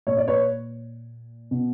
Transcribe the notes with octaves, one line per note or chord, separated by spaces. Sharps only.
A#2 C#5
D5
B4 C#5
B2